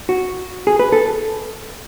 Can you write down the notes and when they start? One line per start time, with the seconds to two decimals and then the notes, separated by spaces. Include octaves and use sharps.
0.09 F#4
0.67 G#4
0.79 B4
0.92 A4